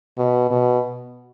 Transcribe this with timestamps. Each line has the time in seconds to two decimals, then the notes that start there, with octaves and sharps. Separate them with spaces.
0.18 B2
0.50 B2